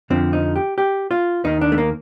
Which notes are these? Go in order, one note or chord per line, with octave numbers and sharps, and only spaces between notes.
F2 D3 F3 C4
D#4
G4
G4
F4
D#2 D#3 D#4
D4
A3
A#3